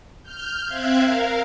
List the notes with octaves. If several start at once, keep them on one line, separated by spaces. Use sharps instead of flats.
F6 G6
C4 E5 F5 F#6 G#6
A#4 F5